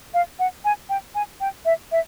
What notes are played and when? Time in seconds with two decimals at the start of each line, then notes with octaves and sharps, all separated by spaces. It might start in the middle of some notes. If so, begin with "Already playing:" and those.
0.14 F5
0.39 F#5
0.65 G#5
0.89 G5
1.15 G#5
1.40 G5
1.65 E5
1.92 E5